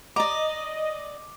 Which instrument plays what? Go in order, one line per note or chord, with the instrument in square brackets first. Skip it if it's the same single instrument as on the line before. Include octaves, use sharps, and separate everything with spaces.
[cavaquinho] D5 A#5 [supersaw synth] D#5 [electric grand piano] D6